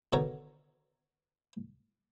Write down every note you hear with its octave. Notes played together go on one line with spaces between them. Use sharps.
B2 D3 D#3 C#5 A#5